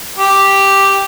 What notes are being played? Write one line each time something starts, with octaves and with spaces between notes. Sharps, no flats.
G4